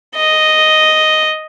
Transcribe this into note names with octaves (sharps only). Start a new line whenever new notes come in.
D#5